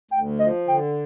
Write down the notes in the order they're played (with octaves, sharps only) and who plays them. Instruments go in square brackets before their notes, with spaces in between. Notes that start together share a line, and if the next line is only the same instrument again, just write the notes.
[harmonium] D2 [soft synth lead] G5
[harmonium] F3 [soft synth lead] D#5
[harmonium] D3 [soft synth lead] G5